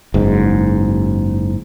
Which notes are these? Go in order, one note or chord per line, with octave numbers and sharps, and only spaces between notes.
F#1 G#2